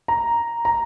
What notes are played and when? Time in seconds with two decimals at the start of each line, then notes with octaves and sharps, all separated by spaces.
0.08 A#5
0.65 A#5